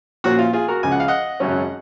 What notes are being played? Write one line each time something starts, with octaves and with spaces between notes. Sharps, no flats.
A#2 F3 A#3 C#4 F#4
F4
F4 G#4
F#4 A#4
C#2 C#3 F3 G#5
F#5
F5
D#5 F#5
G#1 F#2 C#3 F#3 C#4